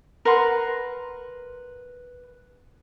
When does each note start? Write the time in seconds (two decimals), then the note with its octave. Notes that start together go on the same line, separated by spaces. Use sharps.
0.25 A#4 B4 F#5 C6